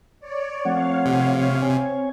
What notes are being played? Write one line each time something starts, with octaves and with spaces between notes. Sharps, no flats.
C#5 D5
F3 A3 C4 C#5 F5 F#5
C3
C4 C#5 G#5